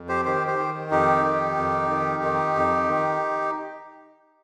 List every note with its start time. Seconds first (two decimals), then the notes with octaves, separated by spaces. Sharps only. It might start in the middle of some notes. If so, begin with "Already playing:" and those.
Already playing: F2
0.09 G4 C5
0.25 D#3 G4 C5
0.47 G4 C5
0.58 D#3
0.91 F2 D#4 G4
1.24 D#3
1.57 F2
1.90 D#3
2.23 D#3
2.56 F2
2.88 D#3